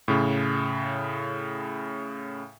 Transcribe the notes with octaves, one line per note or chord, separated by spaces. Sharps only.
A2 C#3